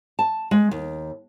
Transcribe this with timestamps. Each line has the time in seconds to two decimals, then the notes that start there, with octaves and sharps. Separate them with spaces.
0.19 A5
0.51 G#3
0.71 D#2